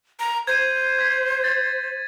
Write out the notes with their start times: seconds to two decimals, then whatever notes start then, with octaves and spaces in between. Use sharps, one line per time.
0.20 A#5
0.47 C5 G#6 D#7
0.99 G#6 B6
1.44 A6